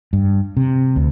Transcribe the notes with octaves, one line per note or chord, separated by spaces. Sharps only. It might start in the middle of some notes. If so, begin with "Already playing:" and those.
G2
C3
D2